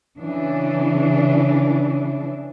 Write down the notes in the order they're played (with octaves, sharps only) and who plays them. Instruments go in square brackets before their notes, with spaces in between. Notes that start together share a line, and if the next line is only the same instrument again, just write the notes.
[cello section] C#3 E3 D4